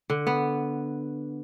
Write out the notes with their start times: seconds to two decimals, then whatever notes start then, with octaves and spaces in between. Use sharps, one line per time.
0.10 D3
0.27 B3